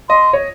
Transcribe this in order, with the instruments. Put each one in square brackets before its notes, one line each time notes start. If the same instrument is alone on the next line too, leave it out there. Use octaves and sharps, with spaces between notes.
[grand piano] D#5 [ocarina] C6
[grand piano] C#5